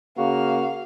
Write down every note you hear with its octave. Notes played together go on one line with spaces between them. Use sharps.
C#3 A#3 F#4 F5